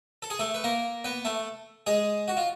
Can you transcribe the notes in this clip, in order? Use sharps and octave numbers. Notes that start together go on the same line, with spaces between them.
A4
G#4
A3 A4
B4
A#3 A#4
B3 B4
A3 A4
G#3 G#4
F#4
F4